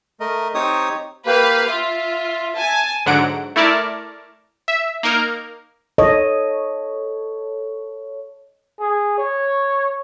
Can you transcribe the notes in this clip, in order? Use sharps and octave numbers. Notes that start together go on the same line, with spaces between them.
A3 A#4 D#5
C4 D#4 G4 C#5 D#6
A#3 G4 B4 F5
F4 E5
G#5 A5
G#2 D3 F#3 F#5 D7
A3 E4 A#4 D5 A5
E5
A#3 D#4 A#4
A4 C#5 D#5
G#4
C#5